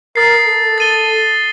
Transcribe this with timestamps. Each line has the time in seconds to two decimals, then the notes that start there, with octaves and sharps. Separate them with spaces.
0.16 A#4 D#6 A6 C7
0.47 A4
0.78 A6 D#7 G7